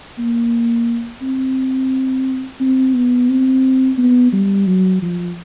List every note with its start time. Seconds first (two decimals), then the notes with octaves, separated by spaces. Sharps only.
0.19 A#3
1.22 C4
2.61 C4
2.95 B3
3.29 C4
3.98 B3
4.33 G3
4.67 F#3
5.03 F3